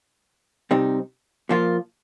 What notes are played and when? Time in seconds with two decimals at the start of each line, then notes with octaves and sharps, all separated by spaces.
0.71 C3 G3 C4 D#4
1.49 A#2 F3 A#3 F4